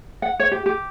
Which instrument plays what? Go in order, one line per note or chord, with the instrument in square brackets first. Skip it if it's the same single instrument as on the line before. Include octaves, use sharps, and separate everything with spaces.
[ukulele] F#5
C#5
G4
G4